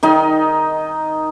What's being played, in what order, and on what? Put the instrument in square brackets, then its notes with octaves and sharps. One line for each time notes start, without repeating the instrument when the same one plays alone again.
[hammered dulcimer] D#3 D#4 D#5